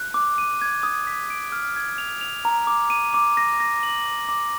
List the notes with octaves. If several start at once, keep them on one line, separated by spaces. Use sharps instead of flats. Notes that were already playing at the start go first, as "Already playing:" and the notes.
Already playing: F#6
D6
D#7
G#6
D#6
B6
D7
F6
G#6
F7
F7
A#5
D6
D#7
D6
A#6
A#6
F#7
D6
D6